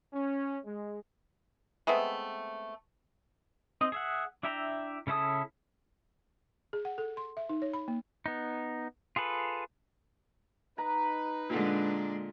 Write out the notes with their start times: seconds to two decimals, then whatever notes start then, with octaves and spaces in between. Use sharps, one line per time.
0.13 C#4
0.65 G#3
1.87 G#3 A3 B3 C4
3.81 C4 D#4 D#5
3.92 G#4 E5 F#5
4.43 D4 E4 E5 G5 A#5
5.07 C#3 C#4 E4 A4 D#6
6.73 G#4
6.85 F#5
6.98 A4
7.17 C6
7.37 E5
7.49 D#4
7.62 C#5
7.73 B5
7.88 A#3
8.26 B3 D#4
9.16 F4 G#4 A4 B4
10.78 D#4 B4 A#5
11.50 A#2 D3 G#3 D4